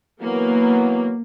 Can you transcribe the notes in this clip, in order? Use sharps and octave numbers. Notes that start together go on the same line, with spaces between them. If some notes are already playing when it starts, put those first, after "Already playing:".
E3 F#3 A#3 B3